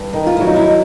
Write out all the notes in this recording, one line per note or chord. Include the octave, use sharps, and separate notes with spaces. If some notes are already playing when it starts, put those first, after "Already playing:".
Already playing: G2
D#3
F4
F#3 E4
D#4
E4